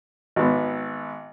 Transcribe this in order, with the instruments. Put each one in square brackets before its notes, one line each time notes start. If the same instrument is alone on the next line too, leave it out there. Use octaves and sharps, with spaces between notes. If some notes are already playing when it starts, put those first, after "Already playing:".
[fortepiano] G#1 B3